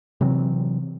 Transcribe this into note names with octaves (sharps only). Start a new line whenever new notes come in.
C3 E3 F#3 C4